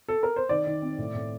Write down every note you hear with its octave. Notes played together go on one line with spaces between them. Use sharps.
A4
A#4
C5
D#3 D5
D#3
C4
A2
A2